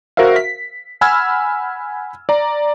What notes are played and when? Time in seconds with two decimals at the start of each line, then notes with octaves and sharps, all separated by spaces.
0.17 F#4 A#4 C5 E5 F5
0.36 B6
1.01 F#5 G#5 B5 E6 F6 G#6
2.29 D5 A#5